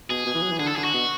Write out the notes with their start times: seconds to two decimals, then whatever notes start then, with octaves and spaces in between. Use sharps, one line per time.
0.09 B2 G#4
0.26 B2
0.34 E3
0.43 F#3
0.52 E3
0.59 D3 G#4
0.68 A4
0.76 D3 G#4
0.84 F#4
0.93 B2